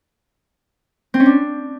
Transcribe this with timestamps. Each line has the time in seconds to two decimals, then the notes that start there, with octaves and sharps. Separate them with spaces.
1.14 C4
1.20 C#4
1.26 D4